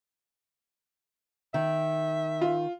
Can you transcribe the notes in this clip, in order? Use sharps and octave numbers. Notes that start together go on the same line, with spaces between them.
D#3 E5
F4